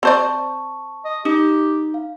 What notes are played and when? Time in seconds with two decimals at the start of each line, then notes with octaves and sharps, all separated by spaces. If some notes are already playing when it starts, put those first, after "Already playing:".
0.03 C4 C5 D5 A5 C#6
1.05 D#5
1.25 D#4 G4
1.94 F5